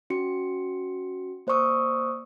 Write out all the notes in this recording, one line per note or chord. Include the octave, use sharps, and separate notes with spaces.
C#4 F#4 C#7
A#3 C5 D5 C#6 D#6 E6